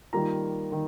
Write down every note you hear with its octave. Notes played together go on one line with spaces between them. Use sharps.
D#3 G3 A#3 F4 A#5
D#3